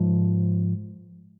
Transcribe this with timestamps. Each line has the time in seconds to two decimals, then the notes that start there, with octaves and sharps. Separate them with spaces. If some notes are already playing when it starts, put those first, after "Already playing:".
Already playing: G#2 F3